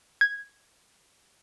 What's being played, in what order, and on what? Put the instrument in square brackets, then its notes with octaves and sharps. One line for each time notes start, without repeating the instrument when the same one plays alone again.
[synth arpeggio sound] G#6